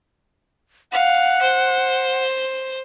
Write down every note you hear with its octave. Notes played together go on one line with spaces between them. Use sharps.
F5 F#5
C5